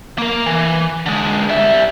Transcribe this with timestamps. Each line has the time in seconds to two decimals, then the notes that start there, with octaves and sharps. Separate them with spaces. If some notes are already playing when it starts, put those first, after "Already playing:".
0.18 A#3 A#4
0.46 E3
1.06 D3 G#3
1.49 G3 E5